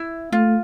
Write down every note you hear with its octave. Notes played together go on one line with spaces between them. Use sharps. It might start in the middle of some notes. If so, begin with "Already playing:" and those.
Already playing: E4
A3 F4